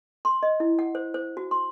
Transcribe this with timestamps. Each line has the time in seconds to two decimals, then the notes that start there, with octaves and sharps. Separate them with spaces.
0.25 C6
0.43 D#5
0.60 E4
0.79 F#5
0.95 C5
1.14 C5
1.37 F#4
1.51 C6